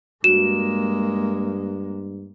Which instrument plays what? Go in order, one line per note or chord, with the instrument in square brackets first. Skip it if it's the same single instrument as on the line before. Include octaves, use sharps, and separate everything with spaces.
[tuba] G2 [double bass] G#3 A#3 [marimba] F#4 [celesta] E7